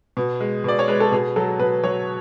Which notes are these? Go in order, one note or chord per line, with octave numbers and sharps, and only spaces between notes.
B2
G#3
B2 D5
C#5
G#3 B4
A4
B2 G#4
F#3 A4
B2 B4
F#3 C#5